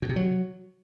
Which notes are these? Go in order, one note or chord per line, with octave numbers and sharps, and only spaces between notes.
B2
C3
F#3